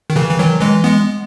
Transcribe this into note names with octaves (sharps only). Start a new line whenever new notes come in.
D#3
C#3 E3
E3
D#3 F#3
E3 G#3
G#3 B3